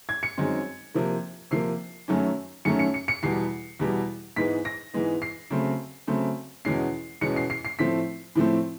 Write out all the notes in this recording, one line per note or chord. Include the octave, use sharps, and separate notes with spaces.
G#6
C#7
F#2 D#3 G#3 C4
C3 F3 A#3
C3 F3 A#3 C7
F#2 D#3 F#3 A3 C#4
F#2 D#3 F#3 A3 C#4 C#7
C#7
C#7
C#7
E2 B2 G3 C7
E2 B2 G3
G#2 E3 G#3 B3 B6
A#6
G#2 E3 G#3 B3
C7
C#3 F#3 A3 C4
C#3 F#3 A3 C4
E2 B2 G#3 C#4 C7
E2 B2 G#3 C#4 C#7
C7
C7
C7
A2 F3 A3 C4 B6
A2 F3 A3 C4